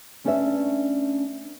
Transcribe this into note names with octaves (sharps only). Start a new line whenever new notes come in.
A3 C#4 D4 B4 D5 E5